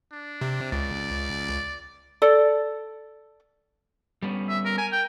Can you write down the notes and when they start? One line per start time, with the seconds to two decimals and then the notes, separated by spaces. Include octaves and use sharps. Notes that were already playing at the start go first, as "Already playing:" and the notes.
0.12 D4
0.41 C3
0.72 C#2 D5
2.22 A4 D5
4.22 G3 B3 C#4
4.49 E5
4.65 A#4
4.78 A#4 G#5
4.92 G5